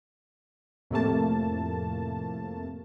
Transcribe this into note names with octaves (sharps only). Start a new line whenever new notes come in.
F2 A2 C3 A3 A#3 A5